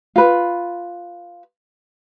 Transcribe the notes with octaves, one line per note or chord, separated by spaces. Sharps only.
F4 B4